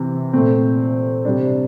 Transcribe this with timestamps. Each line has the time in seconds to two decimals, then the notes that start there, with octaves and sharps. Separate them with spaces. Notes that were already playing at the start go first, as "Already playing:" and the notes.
Already playing: C3 E3
0.33 A#2 A3 C4
1.25 C3 G3 D4